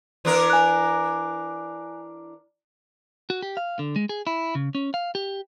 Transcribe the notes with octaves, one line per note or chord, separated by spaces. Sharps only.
E3 D4 A#4
G#5 F#6
F#4
G4
F5
D3
G#3
G#4
E4
C#3
C#4
F5
G4